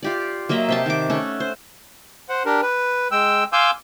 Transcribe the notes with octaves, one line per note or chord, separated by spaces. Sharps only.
F4 G4 D5
F#3 A#3 D#5 E5
C3 G5 A5
D#3 D6
A3 C#4 A4 F#5
C5
C5 F#5
D4 G4 A#4
B4
G#3 G5 E6
F5 G#5 C6 D6 E6 G6